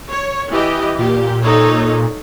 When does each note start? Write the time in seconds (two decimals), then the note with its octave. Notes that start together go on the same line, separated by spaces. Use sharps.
0.11 C#5
0.51 E3 G4 D#5
0.99 A#2 G4
1.41 D#4 A4 C#5